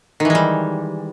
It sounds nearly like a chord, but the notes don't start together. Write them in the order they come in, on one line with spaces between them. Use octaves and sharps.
D#3 E3 G#3 G3